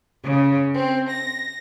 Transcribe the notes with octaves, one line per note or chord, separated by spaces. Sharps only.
C#3
C4
A#6